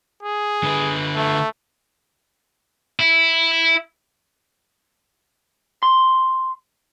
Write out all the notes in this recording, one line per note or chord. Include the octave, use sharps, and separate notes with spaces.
G#4
D3 B4
A3
E4
C6